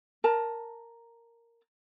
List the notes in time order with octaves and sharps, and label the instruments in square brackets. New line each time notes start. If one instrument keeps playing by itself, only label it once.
[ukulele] A#4 A5 A#5